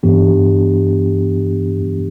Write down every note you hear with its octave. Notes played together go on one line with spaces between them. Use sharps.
G2 E3 B3 D4 G4